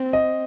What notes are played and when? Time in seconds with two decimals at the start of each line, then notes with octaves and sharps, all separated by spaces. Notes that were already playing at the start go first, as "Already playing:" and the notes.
Already playing: C4
0.13 D#5